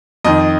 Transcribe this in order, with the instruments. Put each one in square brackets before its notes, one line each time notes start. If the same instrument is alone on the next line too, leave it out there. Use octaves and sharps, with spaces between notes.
[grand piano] F2 D#3 D#5